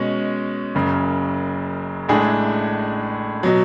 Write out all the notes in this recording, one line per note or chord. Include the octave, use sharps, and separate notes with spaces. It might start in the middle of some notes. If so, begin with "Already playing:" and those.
Already playing: B2 G#3 C#4
F#1 F#2 C#3
A1 A2 G#3 D4 G#4
B2 F#3